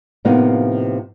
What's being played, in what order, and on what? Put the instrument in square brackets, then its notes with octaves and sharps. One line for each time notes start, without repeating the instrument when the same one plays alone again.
[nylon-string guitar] A2 C3 F3 A#3 B3 D#4